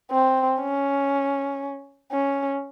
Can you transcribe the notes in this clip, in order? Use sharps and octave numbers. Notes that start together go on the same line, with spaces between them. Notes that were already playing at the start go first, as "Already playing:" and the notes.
C4
C#4
C#4